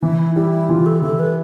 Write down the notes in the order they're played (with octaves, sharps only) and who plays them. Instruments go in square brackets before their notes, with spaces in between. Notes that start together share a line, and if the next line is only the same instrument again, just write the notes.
[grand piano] E3 [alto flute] E4
[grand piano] G3 [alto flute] E4
[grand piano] E3 [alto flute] F4
[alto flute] A4
[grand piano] E3 [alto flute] A4
[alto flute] B4